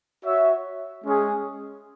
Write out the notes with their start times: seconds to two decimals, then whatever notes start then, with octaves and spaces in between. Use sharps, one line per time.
0.24 F#4 C#5 E5
1.04 G#3 C#4 G#4